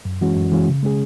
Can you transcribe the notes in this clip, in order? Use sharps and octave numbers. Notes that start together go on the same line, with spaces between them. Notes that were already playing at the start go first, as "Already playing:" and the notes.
F#2
E3 G#3 C#4 F#4
F#2
E3 G#3 C#4 F#4
C#3
G#3 C#4 G#4